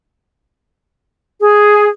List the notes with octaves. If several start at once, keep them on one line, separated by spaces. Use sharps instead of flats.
G#4